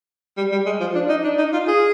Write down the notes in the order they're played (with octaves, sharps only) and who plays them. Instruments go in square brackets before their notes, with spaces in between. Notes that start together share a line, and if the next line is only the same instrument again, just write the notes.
[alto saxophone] G3
G3
G#3
F3
D4
D#4
D4
D#4
F4
G#4